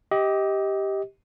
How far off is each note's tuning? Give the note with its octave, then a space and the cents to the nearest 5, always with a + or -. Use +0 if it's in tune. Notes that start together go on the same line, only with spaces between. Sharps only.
G4 +0 D#5 +25